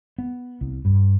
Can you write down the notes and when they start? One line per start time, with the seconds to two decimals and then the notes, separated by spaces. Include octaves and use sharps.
0.18 B3
0.61 C2
0.85 G2